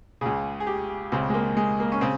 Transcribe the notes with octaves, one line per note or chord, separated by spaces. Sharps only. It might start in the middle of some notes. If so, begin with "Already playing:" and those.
C#2 C#3 G#4
G#4
G4
C#2 C#3 C4
G#3
A#3
G#3
A#3
C#4
C#3 C4